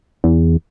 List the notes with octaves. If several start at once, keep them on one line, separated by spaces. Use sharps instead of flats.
E2